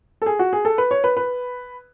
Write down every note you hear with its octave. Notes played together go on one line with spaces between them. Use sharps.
A4
G#4
F#4
G#4
A4
B4
C#5
B4
B4